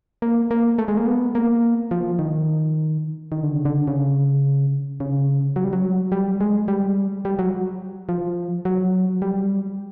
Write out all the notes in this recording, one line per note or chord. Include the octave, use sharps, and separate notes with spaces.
A#3
A#3
A3
G#3
A#3
B3
A#3
F3
D#3
D#3
D3
C#3
D3
C#3
C#3
F#3
G3
F#3
G3
G#3
G3
G3
F#3
F3
F#3
G3